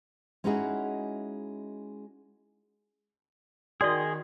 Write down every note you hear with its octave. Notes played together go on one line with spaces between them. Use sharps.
G#3 C#4 D#4 E4 F#4 G#4
D#3 F#4 G#4 D5 D#5 C6